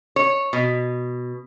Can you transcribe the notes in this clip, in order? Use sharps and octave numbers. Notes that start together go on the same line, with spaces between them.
C#5
B2